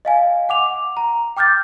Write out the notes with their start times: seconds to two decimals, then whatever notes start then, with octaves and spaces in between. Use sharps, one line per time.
0.05 D#5 F5 G#5
0.49 F#5 D6 F7
0.97 A#5
1.37 G5 D6 F6 G6 A6